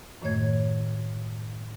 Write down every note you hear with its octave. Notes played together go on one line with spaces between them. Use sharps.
F#2 A2 D#3 A3 C#5 G#6